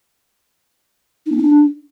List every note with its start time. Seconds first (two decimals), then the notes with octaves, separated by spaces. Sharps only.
1.26 D#4
1.32 B3
1.38 D#4
1.43 D4